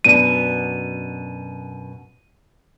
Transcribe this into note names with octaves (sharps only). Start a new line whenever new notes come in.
F#2 B2 D4 D#7